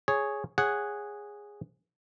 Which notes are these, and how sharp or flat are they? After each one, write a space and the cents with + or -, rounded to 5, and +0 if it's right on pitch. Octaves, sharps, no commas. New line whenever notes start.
G#4 +0 C#5 +0
G#4 -10 C#5 +0 F#5 +0